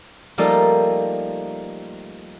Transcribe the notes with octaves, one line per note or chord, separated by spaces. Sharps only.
F3 G3 A3 A#3 D#4 A4